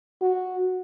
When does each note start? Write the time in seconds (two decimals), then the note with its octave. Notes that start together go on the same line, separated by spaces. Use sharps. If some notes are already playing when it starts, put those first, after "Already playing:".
0.21 F#4